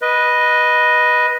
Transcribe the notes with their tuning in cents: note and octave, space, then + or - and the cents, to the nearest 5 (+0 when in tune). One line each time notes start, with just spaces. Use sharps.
B4 -10 D#5 +0